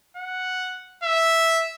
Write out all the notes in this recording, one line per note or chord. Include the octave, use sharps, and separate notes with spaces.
F#5
E5